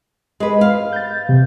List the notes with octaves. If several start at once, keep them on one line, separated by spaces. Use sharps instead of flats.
G#3 B4
F5
G6 A6
C3